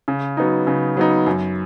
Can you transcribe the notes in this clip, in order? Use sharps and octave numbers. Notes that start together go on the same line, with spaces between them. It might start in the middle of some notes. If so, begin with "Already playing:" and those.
C#3
F#3 B3 D#4
C#3
F#3 B3 D#4
F#2